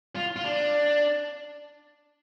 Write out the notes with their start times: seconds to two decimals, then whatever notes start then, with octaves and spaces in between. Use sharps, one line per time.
0.15 F4
0.36 F4
0.44 D4